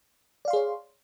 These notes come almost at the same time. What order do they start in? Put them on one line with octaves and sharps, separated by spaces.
D5 F5 C6 G#4 C#5